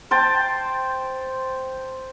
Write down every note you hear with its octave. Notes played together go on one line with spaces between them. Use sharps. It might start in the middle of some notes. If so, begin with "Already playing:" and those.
C5 G5 A5